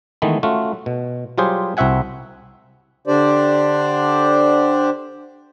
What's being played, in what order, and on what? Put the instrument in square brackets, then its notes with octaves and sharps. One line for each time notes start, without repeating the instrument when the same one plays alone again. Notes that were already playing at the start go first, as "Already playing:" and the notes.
[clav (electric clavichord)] D#3 E3 G#3 A3 B3
A3 C#4 F4 F#4
B2
F#3 G3 F4 G4 G#4 C5
C2 C4 F#4 E5 F#5 G#5
[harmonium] D3 D4 G4 C5 D5